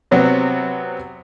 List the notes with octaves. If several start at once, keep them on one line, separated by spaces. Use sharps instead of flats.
C3 F#3 B3 C4